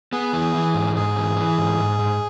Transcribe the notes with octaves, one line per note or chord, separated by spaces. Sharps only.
B3 G#4
E3
E3
G#2
G#2 G#4
E3
E3
G#2
G#2
G#2